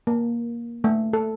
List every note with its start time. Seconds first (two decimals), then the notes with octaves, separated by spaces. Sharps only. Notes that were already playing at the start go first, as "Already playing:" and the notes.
0.07 A#3
0.84 A3
1.13 A4